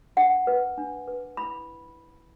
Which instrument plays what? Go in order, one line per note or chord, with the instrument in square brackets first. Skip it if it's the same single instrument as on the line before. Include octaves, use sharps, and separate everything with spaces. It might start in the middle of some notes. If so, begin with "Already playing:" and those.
[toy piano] D4 F#5
B4
D4
B4
E4 B5